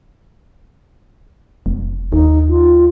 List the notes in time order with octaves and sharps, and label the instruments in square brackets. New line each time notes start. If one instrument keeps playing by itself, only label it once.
[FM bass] F1
[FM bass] D#2 [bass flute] D#4
[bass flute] F4